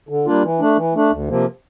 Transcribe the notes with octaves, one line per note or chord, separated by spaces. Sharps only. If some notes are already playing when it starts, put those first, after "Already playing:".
D3
G3 A#3 D4 F4
E3
A3 D4
E3
A3 D4
D2
C3 F3 A#3